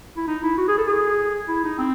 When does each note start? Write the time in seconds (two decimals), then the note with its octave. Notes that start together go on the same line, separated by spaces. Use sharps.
0.17 E4
0.28 D#4
0.43 E4
0.58 F#4
0.68 G#4
0.78 A4
0.87 G#4
1.48 E4
1.64 D#4
1.78 C4